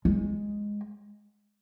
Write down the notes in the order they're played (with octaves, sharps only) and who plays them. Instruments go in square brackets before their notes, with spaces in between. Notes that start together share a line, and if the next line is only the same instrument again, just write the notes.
[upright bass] G#3